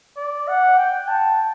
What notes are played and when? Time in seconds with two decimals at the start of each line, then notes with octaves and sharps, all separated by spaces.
0.17 D5
0.48 F#5
0.78 G5
1.08 A5